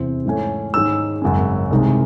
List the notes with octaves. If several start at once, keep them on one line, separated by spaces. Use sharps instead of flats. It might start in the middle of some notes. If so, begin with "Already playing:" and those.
Already playing: E2 C3 E3 C4
G#2 E3 A3 C#4
G#2 D#3 G#3 C#4 E6
G#1 F#2 C#3 G#3 C#4
C2 C3 D#3 G#3